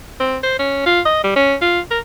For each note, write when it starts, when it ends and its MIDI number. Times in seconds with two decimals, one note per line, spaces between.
0.20 0.37 60
0.43 0.59 72
0.59 0.84 61
0.86 1.00 65
1.05 1.21 75
1.24 1.33 55
1.36 1.55 61
1.61 1.80 65
1.91 1.99 70